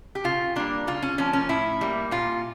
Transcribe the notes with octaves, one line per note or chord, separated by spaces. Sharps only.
G4
C#3 F4
G3 A#3 D4
C#3 F4
C#4
F3 A#3 C#4
C#4
A2 E4
G3 A#3
A#2 F4